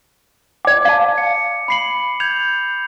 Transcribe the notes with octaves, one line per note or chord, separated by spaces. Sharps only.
D5 G5 D6
F5 A5
C#7
B5 C7 F#7
G6 G#6 F7